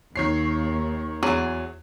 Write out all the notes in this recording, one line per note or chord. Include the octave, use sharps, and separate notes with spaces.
D#2 D#3 C#5 C7
E2 F#3 G#4